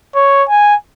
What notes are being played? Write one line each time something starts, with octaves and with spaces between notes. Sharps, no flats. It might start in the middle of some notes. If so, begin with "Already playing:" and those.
C#5
G#5